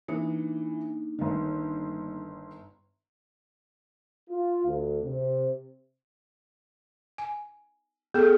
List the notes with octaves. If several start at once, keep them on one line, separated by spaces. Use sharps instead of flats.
E3 A#3 D4 D#4
G1 D#3
F4
D2
C3
G#5
B3 G#4 A4 G5 F6